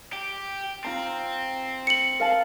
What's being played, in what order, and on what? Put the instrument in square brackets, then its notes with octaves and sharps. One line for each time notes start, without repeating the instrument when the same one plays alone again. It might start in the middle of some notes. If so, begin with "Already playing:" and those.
[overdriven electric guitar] G4
[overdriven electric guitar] C4 [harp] F4 A#5
[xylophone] C#7 F#7
[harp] A#4 F5 A5